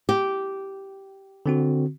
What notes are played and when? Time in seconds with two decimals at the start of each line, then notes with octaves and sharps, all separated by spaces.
0.09 G4
1.46 D3 C4 F#4